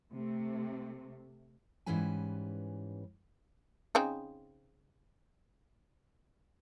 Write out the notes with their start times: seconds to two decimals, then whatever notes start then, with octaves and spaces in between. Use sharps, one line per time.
0.13 C3 A3
1.86 G#2 E3 G3 C#4 B4 G#5
3.95 C#3 C4 D#4